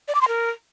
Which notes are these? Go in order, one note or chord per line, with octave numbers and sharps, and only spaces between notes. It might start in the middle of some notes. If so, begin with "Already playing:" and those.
D5
D6
C6
A#4